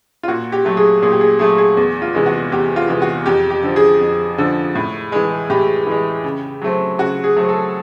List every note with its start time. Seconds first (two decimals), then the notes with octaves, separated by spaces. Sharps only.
0.23 F4
0.28 A#2 F#4
0.52 G4
0.65 F#3 A3
0.77 G#4
1.02 A#2 G#4
1.12 G4
1.21 G#4
1.39 F#3 A3 G#4
1.58 G#4
1.77 E2
2.02 F4
2.15 C3 E3 G#3
2.26 F#4
2.52 E2 G4
2.76 F4
2.88 C3 E3 G#3
3.02 F#4
3.26 F2 G4
3.50 G4
3.63 D3 F3
3.76 G#4
4.01 F2
4.38 D3 F3
4.75 A2
5.12 E3 G#3
5.50 A2 G4
5.87 E3 G#3
6.24 C#3
6.62 F#3 A3 C4
6.98 C#3 F#4
7.24 G#4
7.36 F#3 A3 C4
7.49 A4